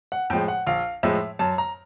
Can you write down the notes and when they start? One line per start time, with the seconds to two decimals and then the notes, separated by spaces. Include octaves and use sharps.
0.12 F#5
0.30 A2 F3 G#3 G5
0.48 F#5
0.67 A#1 F5
1.03 A2 F3 G#3 E5
1.39 F#2 A5
1.58 A#5